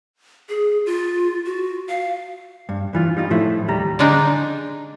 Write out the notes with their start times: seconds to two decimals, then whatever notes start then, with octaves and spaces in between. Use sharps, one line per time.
0.49 G#4
0.86 F4
1.45 F#4
1.89 F5
2.69 G2
2.93 G2 E3 F4
3.17 G3 D#4 F4
3.30 A2 F3 A3 E4
3.68 D#2 G3 A#5
3.99 D3 G#3 D4 D#4